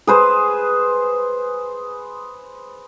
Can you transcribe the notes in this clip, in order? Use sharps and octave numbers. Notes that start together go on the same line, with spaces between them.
G#4 B4 C5